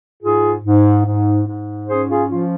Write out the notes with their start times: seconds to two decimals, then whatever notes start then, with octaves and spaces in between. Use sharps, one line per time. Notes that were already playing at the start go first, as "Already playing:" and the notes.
0.23 G#2 F4 G#4
0.64 G#2
1.05 G#2
1.47 G#2
1.88 C#4 G#4 C5
2.09 F4 G#4
2.29 F3 F4